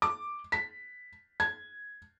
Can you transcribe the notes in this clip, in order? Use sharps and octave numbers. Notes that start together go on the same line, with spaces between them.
D6
B6
G#6